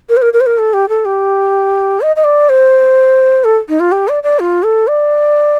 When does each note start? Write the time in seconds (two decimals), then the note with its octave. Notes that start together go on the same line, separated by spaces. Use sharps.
0.09 A#4
0.17 C5
0.22 A#4
0.33 A#4
0.41 C5
0.46 A#4
0.58 A4
0.73 G4
0.89 A4
1.05 G4
2.01 D#5
2.16 D#5
2.24 D5
2.49 C5
3.44 A4
3.69 D#4
3.80 F4
3.92 G4
4.08 D5
4.23 D5
4.39 F4
4.63 A4
4.88 D5